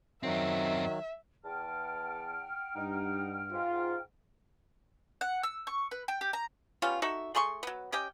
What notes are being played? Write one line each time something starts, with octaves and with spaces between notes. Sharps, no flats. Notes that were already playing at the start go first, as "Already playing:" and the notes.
F#2 D#3 F#3 C4 E5
E2 F#5 G5 A5 F6
G2 D#4
G#2 F4
F#5
E6
C#6
B4
G5
G4
A#5
G3 B3 C#4 F4
D#4 F#4 A4 E5
A3 G#4 C6 C#6
F#3 B3
C#4 G4 D#5 G5